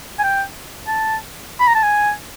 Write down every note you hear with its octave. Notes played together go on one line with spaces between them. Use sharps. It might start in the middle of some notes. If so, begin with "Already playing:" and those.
G#5
G5
A5
B5
A#5
A5
G#5